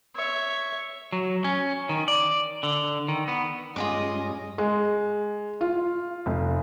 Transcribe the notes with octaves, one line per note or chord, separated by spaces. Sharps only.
C#5 E5
F#3
C#4
D#3
D5
D3
D#3
B3
G2 G#3 C#4 F4 G#4 D#5 D6
G#3
F4
F1